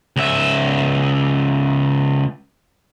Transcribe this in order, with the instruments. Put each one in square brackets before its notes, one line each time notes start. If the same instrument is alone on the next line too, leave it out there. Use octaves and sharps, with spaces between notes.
[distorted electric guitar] C#2 E5